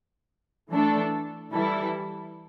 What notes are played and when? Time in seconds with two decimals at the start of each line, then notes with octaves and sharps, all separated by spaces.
0.70 E3 A3 D4 A4
1.53 E3 G3 E4 A4